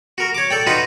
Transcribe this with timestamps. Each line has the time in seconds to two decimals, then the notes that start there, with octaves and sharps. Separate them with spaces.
0.18 F#4 A#4
0.35 C#5 D6
0.50 A4 D5 G5
0.67 D#4 F4 F#4 B4 D#5